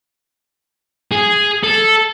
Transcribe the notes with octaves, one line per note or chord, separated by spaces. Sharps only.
G#4
A4